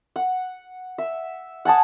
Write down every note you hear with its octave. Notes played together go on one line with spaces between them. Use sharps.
F#5
E5
F#5 G#5 A5 D#6